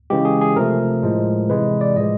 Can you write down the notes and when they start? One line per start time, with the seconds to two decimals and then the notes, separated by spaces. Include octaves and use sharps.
0.10 C#3 E3 G#3 G4
0.25 G#4
0.41 G#4
0.56 C3 F3 A3 A#4
1.03 A2 F3 G#3
1.49 C3 E3 G#3 B4
1.81 D5
1.96 A2 F3 G#3 D#5